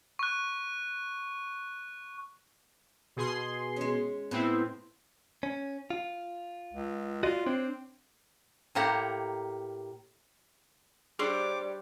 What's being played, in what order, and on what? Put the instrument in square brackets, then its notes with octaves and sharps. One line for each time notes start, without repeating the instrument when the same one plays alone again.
[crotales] C#6 F#6
[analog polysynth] B2 G#4 C6
[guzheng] G#3 C#4
[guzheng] A2 [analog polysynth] B3 C4 E4
[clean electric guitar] C#4
F4
[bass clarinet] C#2
[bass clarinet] F4 [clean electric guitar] F#4 D5 D#5
[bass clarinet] C4 [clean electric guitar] D4 C5 C#5
[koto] A2 A#3 G4 F#5 A#5
[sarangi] G3 [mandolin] D4 C5 C#5 [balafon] G#4 [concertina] D6